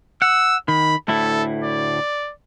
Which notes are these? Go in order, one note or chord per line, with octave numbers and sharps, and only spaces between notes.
F#5 E6
D#3 B5
D2 A2 E4 A4
D5